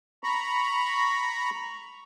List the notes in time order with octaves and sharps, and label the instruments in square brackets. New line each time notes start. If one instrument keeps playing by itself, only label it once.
[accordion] A#5 B5 C#6